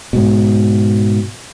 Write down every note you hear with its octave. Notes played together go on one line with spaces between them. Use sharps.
G#2 B2